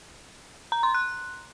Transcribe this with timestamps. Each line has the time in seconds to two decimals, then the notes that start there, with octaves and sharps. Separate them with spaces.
0.72 A#5
0.83 C6
0.94 F#6